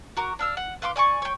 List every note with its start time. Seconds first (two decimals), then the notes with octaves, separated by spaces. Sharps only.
0.17 F#4 A#4 A#5 D6
0.39 D4 F5 E6
0.57 F#5
0.82 B4 F5 C6 D6
0.96 D5 G#5 A#5 C#6
1.22 C#5 G5